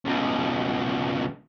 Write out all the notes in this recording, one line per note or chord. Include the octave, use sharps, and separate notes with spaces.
C#2 B2